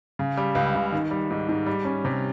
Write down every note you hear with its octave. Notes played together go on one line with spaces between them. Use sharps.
C#3
G3
C#2
C#2
D#3
G3
G#2
G#2
G3
C#4
C3